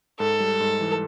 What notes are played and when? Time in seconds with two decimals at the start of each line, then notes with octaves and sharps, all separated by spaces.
0.20 G#2 A4
0.40 G3
0.60 G#2
0.81 E3